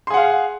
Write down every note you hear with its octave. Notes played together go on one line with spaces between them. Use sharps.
G#4 F5 F#5 C6